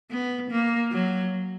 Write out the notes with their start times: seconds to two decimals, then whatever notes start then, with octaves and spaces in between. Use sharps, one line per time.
0.11 B3
0.51 A#3
0.92 F#3